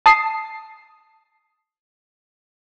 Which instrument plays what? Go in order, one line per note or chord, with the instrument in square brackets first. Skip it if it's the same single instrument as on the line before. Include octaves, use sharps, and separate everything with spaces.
[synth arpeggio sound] A5 D#6 C7